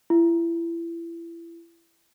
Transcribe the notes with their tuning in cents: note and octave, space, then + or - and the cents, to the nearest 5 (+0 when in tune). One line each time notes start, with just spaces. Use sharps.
E4 +30